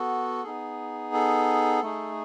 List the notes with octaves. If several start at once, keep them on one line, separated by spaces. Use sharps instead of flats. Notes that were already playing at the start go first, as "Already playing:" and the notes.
Already playing: B3 F#4 A4
B3 D#4 G#4
A4
A3 D#4 G#4